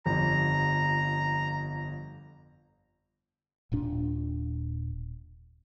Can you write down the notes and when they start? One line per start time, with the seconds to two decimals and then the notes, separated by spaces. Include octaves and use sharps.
0.06 G1 F2 A#5
3.72 D#1 A#2 D4